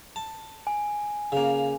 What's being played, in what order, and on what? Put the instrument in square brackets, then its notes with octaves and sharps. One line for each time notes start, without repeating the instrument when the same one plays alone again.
[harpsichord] A5
[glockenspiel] G#5
[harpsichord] C#3 A#3